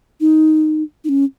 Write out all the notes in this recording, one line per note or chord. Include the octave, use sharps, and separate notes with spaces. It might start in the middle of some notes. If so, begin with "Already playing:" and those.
D#4
D#4
C#4